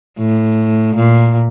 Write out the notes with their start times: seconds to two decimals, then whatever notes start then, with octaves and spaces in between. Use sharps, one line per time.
0.18 A2
0.95 A#2